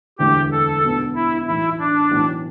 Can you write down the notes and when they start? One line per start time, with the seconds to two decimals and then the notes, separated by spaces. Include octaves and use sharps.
0.18 E1 D2 D3 A3 E4 G4
0.52 A4
0.83 B1 B2 B3 D4
1.15 E4
1.47 B1 A2 E3 E4
1.79 D4
2.11 B1 A2 E3